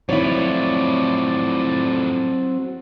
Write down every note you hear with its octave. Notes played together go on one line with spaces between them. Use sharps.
F2 A2 F#3 C4 E4 C#5 D5